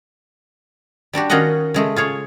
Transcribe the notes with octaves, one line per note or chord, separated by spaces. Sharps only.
G3 D4 F#4 G4
D#3 C#4 F4 F#4 D#5 F#5
C#3 G#3 A3
F4 G#4 C#5